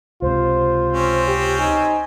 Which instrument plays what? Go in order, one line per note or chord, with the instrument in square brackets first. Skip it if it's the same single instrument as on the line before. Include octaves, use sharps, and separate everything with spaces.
[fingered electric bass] C#2 C3 [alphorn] F4 [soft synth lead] C5
[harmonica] C4 C#4
[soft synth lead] G4
[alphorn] D#4 [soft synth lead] G#5